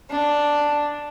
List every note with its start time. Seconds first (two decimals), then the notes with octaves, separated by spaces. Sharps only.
0.11 D4